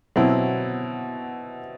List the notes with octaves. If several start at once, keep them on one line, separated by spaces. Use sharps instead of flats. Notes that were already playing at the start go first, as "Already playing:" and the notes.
B2 F#3 C4 E4